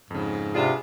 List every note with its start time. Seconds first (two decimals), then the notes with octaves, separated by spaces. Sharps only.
0.11 F2 G#2 C#3
0.55 C3 B3 D4 F4 G#4